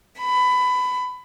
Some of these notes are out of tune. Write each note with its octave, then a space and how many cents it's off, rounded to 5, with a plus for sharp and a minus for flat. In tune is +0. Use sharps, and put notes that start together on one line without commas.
B5 +20